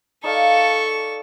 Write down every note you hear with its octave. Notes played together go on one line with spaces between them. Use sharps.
D#4 A4 D5 F5 C#6